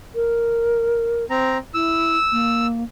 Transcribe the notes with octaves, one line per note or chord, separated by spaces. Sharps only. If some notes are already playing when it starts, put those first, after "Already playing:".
A#4
C4 A#5
E4 E6
A#3